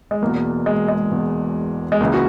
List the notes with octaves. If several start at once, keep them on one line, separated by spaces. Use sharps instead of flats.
G#3
E1 E2 B2 A#3
G#3
G#3
E1 E2 B2
G#3
C#2 C#3 E3 A#3
F#4